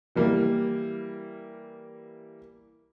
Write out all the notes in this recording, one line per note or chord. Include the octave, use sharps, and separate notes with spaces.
E3 G3 A#3